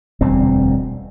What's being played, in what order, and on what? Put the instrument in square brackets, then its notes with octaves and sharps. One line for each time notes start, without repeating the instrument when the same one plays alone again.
[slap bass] E1 D2 G3 C4